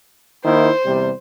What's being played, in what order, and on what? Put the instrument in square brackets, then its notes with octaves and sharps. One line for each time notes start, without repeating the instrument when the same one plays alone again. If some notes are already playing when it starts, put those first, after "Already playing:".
[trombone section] D#3 A#3 E4 [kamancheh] C5
[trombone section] E2 C3 G3